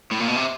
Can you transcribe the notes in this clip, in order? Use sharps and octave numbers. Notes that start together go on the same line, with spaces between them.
A2
A#2
B2
C3